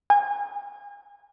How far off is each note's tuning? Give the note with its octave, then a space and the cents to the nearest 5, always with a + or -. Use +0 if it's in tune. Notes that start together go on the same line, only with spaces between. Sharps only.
G#5 -35